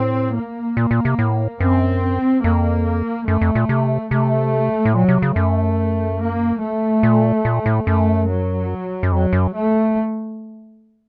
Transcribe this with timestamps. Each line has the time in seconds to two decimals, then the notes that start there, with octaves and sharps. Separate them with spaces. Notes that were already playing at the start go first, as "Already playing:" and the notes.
Already playing: A2 C4
0.35 A#3
0.77 A#2
0.91 A#2
1.05 C3
1.19 A2
1.60 F#2 C4
2.44 F2 A#3
3.27 F#2 A3
3.41 F2
3.55 A#2
3.69 C3
4.11 C3 A3
4.85 A2
4.95 A#2 F#3
5.09 C3
5.22 C#3
5.36 F#2 A3
6.20 A#3
6.61 A3
7.03 A#2
7.45 A#2
7.66 A2
7.86 F#2 A3
8.29 F#3
9.03 F#2
9.12 F2 F#3
9.33 F#2
9.54 A3